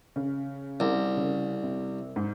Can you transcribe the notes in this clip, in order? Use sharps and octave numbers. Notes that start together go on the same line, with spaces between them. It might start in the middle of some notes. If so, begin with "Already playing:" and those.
C#3
C2
C#3
C3
G#2